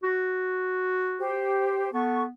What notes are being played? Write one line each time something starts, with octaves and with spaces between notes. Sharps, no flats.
F#4
G4 C5
B3 A4 C#6